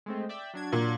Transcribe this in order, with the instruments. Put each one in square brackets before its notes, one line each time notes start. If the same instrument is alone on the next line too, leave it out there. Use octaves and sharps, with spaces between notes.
[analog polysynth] G#3 A3 C4
D5 E5 G5
F#3 D4 G#6
[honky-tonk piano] A#2